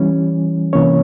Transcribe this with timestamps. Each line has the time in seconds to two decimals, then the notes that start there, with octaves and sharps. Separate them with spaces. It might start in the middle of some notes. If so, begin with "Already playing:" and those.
Already playing: E3 G3 C#4
0.73 C3 E3 A#3 C#4 C#5